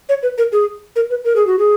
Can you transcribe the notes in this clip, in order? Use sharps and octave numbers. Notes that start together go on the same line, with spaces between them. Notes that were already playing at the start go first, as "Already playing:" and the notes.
C#5
B4
A#4
G#4
A#4
B4
A#4
G#4
F#4
G#4